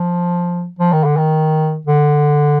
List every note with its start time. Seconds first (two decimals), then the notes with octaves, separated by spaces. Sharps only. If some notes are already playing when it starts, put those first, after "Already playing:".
Already playing: F3
0.79 F3
0.93 D#3
1.04 D3
1.17 D#3
1.87 D3